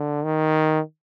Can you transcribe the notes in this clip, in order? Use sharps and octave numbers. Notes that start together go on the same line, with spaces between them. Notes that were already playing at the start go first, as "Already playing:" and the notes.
Already playing: D3
D#3